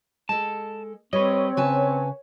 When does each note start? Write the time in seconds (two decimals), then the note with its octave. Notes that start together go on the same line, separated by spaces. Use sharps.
0.29 G#3 A4 A5
1.13 G3 C4 B4 C#5 D#5
1.57 C#3 B4 G#5 A5